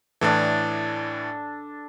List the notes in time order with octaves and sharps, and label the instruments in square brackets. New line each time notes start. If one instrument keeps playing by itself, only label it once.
[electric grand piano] A2 E3 [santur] D4 A4